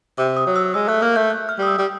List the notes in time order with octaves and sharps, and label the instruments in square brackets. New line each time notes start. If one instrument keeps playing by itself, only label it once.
[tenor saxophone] C3 [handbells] D6
[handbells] D#6
[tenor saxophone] F#3
[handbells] E6
[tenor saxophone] G#3 [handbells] E6
[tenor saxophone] A3 [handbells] F#6
[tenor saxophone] A#3 [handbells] F6
[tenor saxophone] A3 [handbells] G6
[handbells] F#6
F6
[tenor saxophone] G3 [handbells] D#6
[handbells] E6
[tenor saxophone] G3